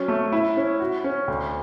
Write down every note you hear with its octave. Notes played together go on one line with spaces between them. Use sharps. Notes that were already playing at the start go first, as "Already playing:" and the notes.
Already playing: F#3 C#4
A3
E4
C#4
F#4
C#4
D2